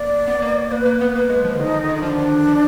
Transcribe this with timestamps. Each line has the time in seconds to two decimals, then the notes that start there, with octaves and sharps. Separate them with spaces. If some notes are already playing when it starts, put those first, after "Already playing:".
Already playing: A#3 D5
0.27 B3
0.42 A#3
0.57 A#3
0.71 A#3 B4
0.86 A#3
1.01 B3
1.15 A#3
1.29 G#3
1.44 F3
1.55 D3
1.59 D#3 D#4
1.67 F3
1.73 D#3
1.84 D3
1.89 D#3
1.95 D#4
2.02 F3 D4
2.18 D#3
2.47 F3